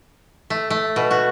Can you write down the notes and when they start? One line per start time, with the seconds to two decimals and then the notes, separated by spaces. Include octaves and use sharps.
0.50 A3
0.70 A3
0.96 B2
1.11 F#4